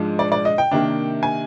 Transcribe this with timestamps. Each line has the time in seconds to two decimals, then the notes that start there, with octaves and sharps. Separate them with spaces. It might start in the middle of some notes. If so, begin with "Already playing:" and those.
Already playing: G#2 F3 G#3 D4
0.19 D5
0.32 D5
0.45 D#5
0.58 G5
0.72 C3 D#3 A#3 D4
1.23 G#5